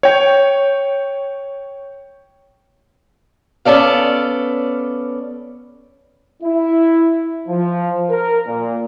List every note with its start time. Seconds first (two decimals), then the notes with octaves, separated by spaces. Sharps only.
0.03 C#5 G5
3.65 B3 C#4 A4 D5 F5
6.42 E4
7.48 F3
8.10 A#4
8.46 A#2